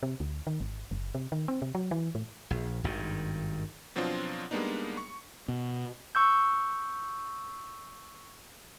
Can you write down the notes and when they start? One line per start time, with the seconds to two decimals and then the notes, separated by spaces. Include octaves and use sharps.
0.03 C3
0.20 D2
0.47 D#3
0.60 G#1
0.91 F#1
1.15 C3
1.32 D#3
1.48 C4
1.62 C3
1.75 F#3
1.91 E3
2.15 A2
2.50 A#1
2.84 G#1 G2 D#3
3.96 B2 F3 F#3 C4 D4 F4
4.51 G3 G#3 A#3 B3 D4 D#4
4.97 C#6
5.48 B2
6.15 C#6 E6 G6